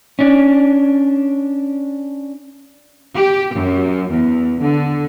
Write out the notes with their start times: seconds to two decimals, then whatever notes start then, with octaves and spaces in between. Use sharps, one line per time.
0.19 C#4 D4
3.15 G4
3.54 F#2
4.09 E2
4.61 D3